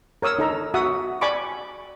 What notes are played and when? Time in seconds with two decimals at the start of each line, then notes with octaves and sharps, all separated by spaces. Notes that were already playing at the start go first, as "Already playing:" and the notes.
0.22 A#4 C#5 D#6 E6
0.39 D#4 A4 A#5
0.74 F#4 E5 F#5 D#6
1.21 D5 G#5 B5 C#6 D6